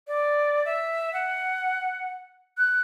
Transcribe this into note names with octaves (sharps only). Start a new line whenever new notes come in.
D5
E5
F#5
F#6